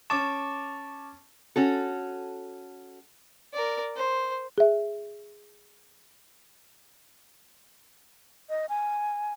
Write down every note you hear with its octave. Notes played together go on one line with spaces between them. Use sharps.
C#4 A5 C#6 D6 A6 E7
C#4 F#4 A4
A#4 D5
C5
G#4 E5
D#5
G#5